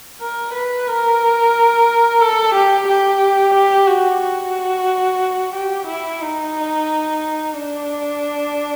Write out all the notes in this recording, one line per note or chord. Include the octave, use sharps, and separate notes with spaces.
A#4
B4
A#4
A4
G4
G4
G4
F#4
F#4
G4
E4
D#4
D4